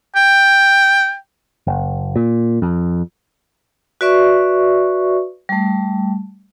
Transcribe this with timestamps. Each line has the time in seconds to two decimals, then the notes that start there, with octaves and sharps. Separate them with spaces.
0.16 G5
1.67 F#1
2.16 A#2
2.62 F2
4.01 F#4 B4 D5 E5 C#6
5.49 G3 A3